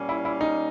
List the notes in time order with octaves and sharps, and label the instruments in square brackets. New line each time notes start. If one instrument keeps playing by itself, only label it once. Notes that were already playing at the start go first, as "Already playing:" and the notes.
Already playing: [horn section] A#2 G3 A#3 C#4
[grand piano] E4
E4
D#4